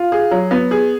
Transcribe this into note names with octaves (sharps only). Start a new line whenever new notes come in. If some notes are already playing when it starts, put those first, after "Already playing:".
Already playing: F4
G#4
F#3
B3
G#4